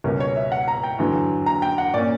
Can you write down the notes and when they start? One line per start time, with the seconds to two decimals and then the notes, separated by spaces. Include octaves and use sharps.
0.04 C#2 B2 G3 C#4 A#4
0.20 C#5
0.36 E5
0.52 F#5
0.68 A#5
0.84 G5
0.99 E2 D3 F#3
1.46 A#5
1.62 G5
1.78 F#5
1.94 A#2 A#3 C#4 D5